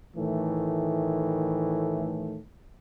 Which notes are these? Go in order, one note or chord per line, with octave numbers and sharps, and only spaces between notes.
A2 D#3 E3 A3